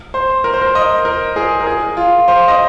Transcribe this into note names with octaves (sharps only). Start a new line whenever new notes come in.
C5
A#4
C5
A#4
D#5
A#4
G#4
A#4
G#4
F4
C5
D#5